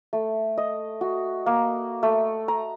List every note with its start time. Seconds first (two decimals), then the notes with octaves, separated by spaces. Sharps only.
0.13 A3
0.58 D#5
1.01 F#4
1.46 A#3
2.03 A3
2.48 A#5